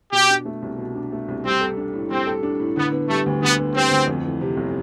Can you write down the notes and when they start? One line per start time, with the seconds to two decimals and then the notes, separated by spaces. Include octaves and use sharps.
0.12 B2 G4
0.30 D4
0.45 A3
0.62 C2
0.78 B2
0.95 D4
1.12 A3
1.28 C2
1.45 G3 C4
1.61 A4
1.77 D4
1.93 A2
2.10 G3 C4
2.27 A4
2.43 D4
2.60 A2
2.76 D3 B3
2.92 B3
3.09 G3 A3
3.26 D2
3.42 D3 B3
3.59 B3
3.75 G3 C4
3.91 D2
4.08 F2
4.24 E3
4.41 C3
4.57 G1